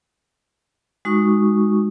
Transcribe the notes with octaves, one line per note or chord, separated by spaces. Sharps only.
G#3 D#4 F#4 C#6